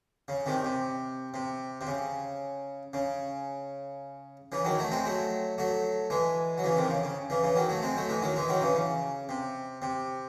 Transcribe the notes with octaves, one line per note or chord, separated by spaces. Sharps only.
C#3
C3 D#3
C3
C3
C3
C#3
C#3
C#3 E3
D#3 F#3
F#3 A3
G#3 C4
F#3 A3
F#3 A3
E3 G#3
F#3
C#3 E3
C3 D#3
C#3
C#3
C#3 E3
C#3 E3
D#3 F#3
F#3 A3
G#3 C4
F#3 A3
E3 G#3
D#3 F#3
E3 G#3
D#3 F#3
C#3 E3
C#3
C3
C3